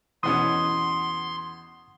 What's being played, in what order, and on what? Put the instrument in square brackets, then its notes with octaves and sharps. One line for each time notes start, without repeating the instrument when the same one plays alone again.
[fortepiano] E2 B2 C#4 [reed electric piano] F#5 D#6 [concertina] C6